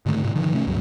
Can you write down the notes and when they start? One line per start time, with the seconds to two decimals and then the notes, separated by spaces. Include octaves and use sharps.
0.06 G#2 D3 D#3 A3
0.22 G#2 C3
0.35 D3 D#3 F3
0.53 C3 A3 C#4
0.67 C#2 G2 B2 F#3